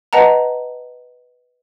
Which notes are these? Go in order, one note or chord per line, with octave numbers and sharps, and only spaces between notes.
B4 D#5 F#5 A5 A#5